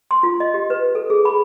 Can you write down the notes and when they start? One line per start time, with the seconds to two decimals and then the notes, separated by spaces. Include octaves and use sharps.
0.11 C6
0.23 F4
0.40 D#5
0.54 G4
0.70 B4
0.95 A4
1.10 G#4
1.25 B5